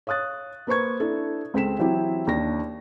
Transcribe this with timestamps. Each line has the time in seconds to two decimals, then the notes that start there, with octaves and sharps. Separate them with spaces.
0.07 C#5 F5 D#6 F#6 A6
0.67 A#3 B4 C5 C#6 G#6
1.00 D4 E4 A4
1.54 C#2 C4 A4 B6 E7
1.78 E3 F#3 C4 E4 G4
2.27 D#2 D4 A#6